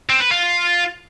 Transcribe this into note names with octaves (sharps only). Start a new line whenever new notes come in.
C4
B4
F4